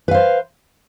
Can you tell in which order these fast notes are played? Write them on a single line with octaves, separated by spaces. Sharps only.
B4 F5 C5